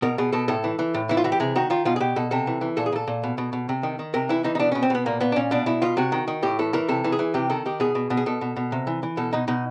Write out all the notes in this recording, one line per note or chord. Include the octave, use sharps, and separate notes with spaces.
B2 A#4
B2 G#4
B2 A4
A2 A4
E3
E3
A2
E3 E4
F4
E3 F#4
G4
C3 G#4
D#3 F#4
D#3 F4
B2 F4
G#4
B2 G4
B2 A4
C3 A4
E3
E3
A#2 A4
G#4
A#2 A4
A#2
B2
B2
B2
C3
D#3
D#3
C3 A#4
E3 E4
E3 D#4
D#4
B2 D4
B2 C#4
C4
B2 B3
A#2 A#3
A#2 B3
D4
A#2 C#4
B2 D4
B2 E4
B2 F4
C3 F#4
D#3
D#3
A2 G4
E3 A4
E3 A#4
C3 A4
E3
G#4
E3
C3 G4
D#3 A4
D#3 G4
B2 G#4
B2
B2
G#4
B2 A4
B2
B2
C3
E3
E3
B2 A4
B2 D#4
B2 D#4